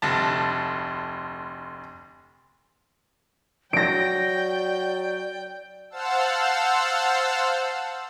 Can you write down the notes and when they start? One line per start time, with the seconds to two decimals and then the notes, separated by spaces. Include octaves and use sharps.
0.02 F1 D2 A5
3.73 F#3 D5 G5 A#6 D7
5.90 C5 F5 F#5 A5 E6